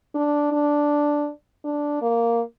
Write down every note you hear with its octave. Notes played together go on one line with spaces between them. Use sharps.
D4
D4
D4
A#3